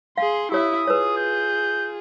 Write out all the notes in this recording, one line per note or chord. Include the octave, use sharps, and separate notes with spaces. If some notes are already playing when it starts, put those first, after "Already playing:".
G#4 F5 C6
E4 G4 C#5 E5 D#6
F4 G#4 B4 C#5
G6